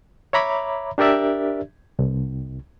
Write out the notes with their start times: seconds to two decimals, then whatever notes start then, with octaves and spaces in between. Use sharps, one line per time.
0.33 C#5 E5 A#5 B5 D6
0.98 D4 G4 A#4 D5 E5
1.99 C2